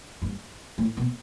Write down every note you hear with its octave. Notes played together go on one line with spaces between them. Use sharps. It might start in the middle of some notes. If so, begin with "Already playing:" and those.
G2
A2
B2